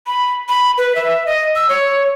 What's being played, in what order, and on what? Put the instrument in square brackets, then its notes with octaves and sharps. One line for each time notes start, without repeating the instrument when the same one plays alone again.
[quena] B5
B5
B4
E5
D#5
E6
C#5